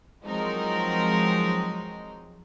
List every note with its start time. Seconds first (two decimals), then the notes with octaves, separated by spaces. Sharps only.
0.22 F3 F#3 G#3 C4 D#4 A#4